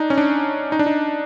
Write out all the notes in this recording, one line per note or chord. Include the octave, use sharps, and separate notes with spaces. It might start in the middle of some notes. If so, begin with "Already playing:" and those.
Already playing: D4 D#4
C#4
D4
D#4
D4
D#4